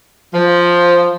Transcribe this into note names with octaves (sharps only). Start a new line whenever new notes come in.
F3